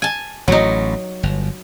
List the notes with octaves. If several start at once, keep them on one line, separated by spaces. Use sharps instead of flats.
G#5 A5
A1 A2 F#3 D#4
G1